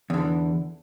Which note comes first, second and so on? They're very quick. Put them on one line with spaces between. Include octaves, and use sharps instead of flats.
E2 D3 E3